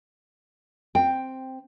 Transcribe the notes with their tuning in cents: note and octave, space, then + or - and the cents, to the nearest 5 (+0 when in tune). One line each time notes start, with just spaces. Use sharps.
C4 +0 G5 +5